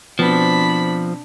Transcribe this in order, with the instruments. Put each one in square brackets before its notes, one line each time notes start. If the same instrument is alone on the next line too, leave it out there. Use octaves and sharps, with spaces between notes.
[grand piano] B2 B3 C4 [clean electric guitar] F3 [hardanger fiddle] D4 B5